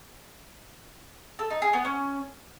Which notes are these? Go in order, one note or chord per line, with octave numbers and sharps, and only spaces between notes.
A4
D#4
G#4
B3
C#4